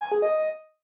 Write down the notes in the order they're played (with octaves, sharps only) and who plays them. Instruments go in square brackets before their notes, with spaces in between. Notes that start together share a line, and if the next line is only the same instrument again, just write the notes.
[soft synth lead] G#5
G#4
D#5